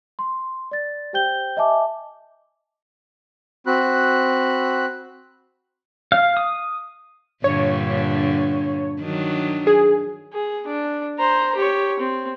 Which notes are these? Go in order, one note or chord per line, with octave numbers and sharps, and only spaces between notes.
C6
D5 A6
G4 C5 G5 G6 G7
D#5 E5 G#5 A5 D6
C4 F#4 B5 F#6
F5
D#6
G2 A#2 D3 C#5
D#3 F#3 D4
G#4
G#4
D4
C5 A#5
G4 C#5
C4